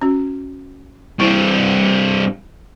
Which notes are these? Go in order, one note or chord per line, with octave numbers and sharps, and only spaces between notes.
C#4 F#4
G2 C4 E4 C5